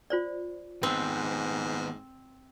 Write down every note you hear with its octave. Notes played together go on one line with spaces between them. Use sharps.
F4 C5 D5
D#2 G#2 B3 C4